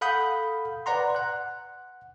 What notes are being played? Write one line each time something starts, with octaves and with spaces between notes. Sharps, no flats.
A4 F5 F#5 B5 D#6 G6
B4 D5 F#5 A#5 C6
F#5 F#6